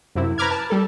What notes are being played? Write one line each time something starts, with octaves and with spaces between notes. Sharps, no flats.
F#2 C3 E4
B4 A#5 B5 D6 F6 G#6
A5
G3 A4